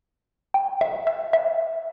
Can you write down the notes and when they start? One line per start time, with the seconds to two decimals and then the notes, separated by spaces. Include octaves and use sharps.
0.54 G5
0.81 E5
1.07 E5
1.33 E5